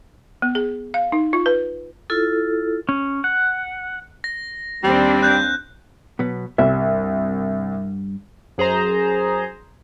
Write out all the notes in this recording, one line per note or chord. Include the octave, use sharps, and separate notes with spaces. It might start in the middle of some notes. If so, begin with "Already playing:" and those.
B3
G#4
F5
D#4
F4
B4
E4 F4 A4
C#4
F#5
A#6
D#2 G3 C4 D4
F#6 G6
B2 F#3 B3
C2 G2 E5
F#2 G#4 C5 A#5